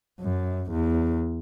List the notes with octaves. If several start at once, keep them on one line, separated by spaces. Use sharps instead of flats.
F#2
E2